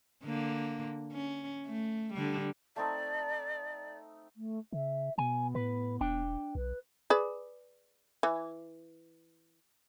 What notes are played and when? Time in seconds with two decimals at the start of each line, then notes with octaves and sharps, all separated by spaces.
0.24 D3 A#3
1.13 C#4
1.67 A3
2.14 D3 G3
2.76 A3 C4 D#4 D5
4.36 A3
4.73 C#3 E5
5.18 B2 B3 G#5
5.55 A2 B4
6.01 E1 D4 G5
6.55 B1 B4
7.10 G#4 B4 D5
8.23 E3